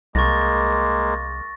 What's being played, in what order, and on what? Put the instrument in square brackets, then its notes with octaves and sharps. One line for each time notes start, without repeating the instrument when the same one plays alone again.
[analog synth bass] C2 [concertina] G#3 A#3 [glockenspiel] C#6 A6 A#6